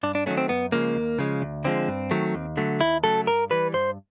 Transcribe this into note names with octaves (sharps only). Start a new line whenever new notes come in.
G2 D4
D4
D#3 F#3 A3 C#4
C4
F#2 B3
C#3 F3 G#3 A#3
D#2
C#3 F3 G#3
D2
D3 F3 G#3 C4
G2
D#3 F#3 A3
D#2
D3 F#3 A3
D#2 E4
C#3 F#3 A3 A4
G2 A#4
E3 G3 B4
G2 C5